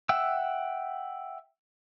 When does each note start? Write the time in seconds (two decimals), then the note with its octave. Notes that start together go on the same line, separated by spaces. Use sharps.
0.09 E5 F#5 G5 E6